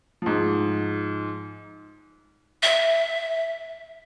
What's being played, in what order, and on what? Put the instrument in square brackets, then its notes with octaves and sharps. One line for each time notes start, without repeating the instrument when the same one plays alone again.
[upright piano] G#2 F3
[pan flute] E5